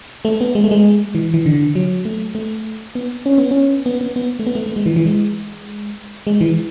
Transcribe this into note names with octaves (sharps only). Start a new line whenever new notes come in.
A3
B3
G#3
A3
G#3
E3
E3
D3
F#3
A3
A3
B3
C#4
B3
C#4
B3
B3
B3
A3
B3
A3
A3
G#3
E3
E3
G#3
G#3
E3